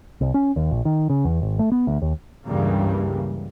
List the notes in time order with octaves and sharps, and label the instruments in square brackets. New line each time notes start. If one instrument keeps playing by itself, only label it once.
[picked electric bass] C2
C#4
D#2
A#1
D#3
C#3
E2
G#1
A3
B3
D2
D#2
[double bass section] C#2 G2 C#3 E3 G3 A#3